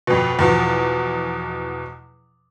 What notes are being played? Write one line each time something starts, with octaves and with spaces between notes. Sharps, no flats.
F2 B2
E2 B2 F3